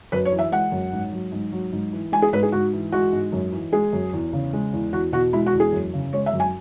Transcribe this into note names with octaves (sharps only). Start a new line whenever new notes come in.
F#2 B4
C#5
E3
E5
G#3 F#5
F#2
G#2
F#3
G#2
F#3
G#2
E3
G#3 G#5
G#4
G#2 B4
G#4
G#2 F#4
E3
G#3 F#4
G#2
F#2
E3
G#3 G#4
F#2
E2
C#3
G#3
E2
E2 F#4
B2 F#4
G#3 E4
F#4
E2
G#4
F#2
C#3
G#3 C#5
E5
F#2
G#5